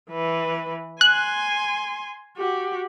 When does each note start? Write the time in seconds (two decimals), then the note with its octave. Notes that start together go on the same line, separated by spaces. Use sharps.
0.11 E3 B4
1.01 G#5 C6 F#6
2.37 F#4 G4